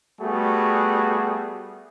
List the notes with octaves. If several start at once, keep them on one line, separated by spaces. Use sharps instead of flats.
G3 A3 B3 F#4 G#4